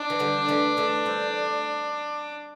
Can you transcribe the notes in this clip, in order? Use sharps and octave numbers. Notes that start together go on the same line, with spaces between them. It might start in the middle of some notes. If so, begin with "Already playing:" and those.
Already playing: D4
E3
D3 G3
E3 A3
E3 A3
G3 C4